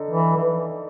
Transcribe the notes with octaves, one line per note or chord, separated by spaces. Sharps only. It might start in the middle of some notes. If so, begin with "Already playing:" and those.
Already playing: D3 D#4
E3
E3